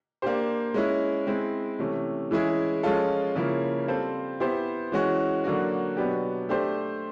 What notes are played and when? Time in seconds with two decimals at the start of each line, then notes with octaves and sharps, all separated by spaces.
0.22 A#3 D4 G4 C5
0.74 G#3 C#4 E4
1.27 G#3 C4 E4
1.79 C3 E3 A3 C#4
2.31 E3 G#3 C#4 E4 G#4
2.83 F3 G#3 C#4 F4 A4
3.36 C#3 F3 A#3 C#4 E4
3.88 G3 C4 F4 A4 C5
4.40 B3 E4 G4 C5
4.92 E3 G#3 C#4 F#4
5.44 D3 F#3 A#3 D4 F#4
5.97 B2 F#3 B3 D4 G4
6.49 A3 D4 G4 C5